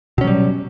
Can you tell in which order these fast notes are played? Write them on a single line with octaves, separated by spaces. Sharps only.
B2 C#4 F#3 G3